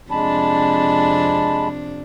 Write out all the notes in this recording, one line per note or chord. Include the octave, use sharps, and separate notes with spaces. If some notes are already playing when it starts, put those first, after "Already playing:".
F2 C3 G#3 D4 A5 B5